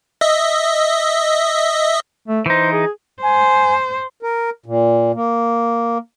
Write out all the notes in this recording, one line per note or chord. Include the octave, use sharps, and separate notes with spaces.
D#5 E5
A3
E3 D#4 C5
G#4
C5 G#5
A#4
A#2
A#3